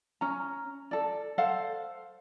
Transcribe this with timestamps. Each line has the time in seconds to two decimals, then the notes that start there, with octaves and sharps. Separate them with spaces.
0.21 C#4 A#5
0.91 A4 D5
1.38 A4 C5 F5 F#5